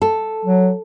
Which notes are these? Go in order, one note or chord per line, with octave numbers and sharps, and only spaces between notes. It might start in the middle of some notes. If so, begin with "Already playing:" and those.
A4
F#3